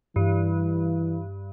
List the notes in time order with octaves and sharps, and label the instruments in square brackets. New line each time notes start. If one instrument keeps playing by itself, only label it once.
[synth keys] G2 [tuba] E3